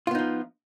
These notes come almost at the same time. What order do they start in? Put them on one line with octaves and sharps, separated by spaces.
F4 B3 D#4 F3